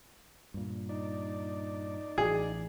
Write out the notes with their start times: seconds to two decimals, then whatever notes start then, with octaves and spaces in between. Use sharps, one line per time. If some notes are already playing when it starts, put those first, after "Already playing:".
0.54 G2 A#2
0.89 D#4 D5
2.18 A1 G#4